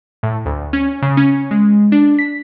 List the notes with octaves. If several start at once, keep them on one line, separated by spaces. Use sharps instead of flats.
A2
D2
C#4
C#3
C#4
G#3
D4
B6